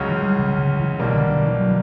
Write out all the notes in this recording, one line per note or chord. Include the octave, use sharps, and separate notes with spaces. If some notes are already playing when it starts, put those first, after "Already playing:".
Already playing: C#2 C#3 F#3 C#4
E3
G3
C#3
C#3
E3
B1 B2 G3 A#3 D4
D3
D3
E3
F#3